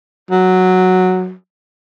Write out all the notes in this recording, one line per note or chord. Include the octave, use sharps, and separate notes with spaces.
F#3